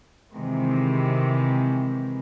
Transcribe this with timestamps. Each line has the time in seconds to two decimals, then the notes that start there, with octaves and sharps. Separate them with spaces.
0.31 C3 D#3 E3 G#3